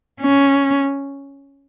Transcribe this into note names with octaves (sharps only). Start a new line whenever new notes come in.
C#4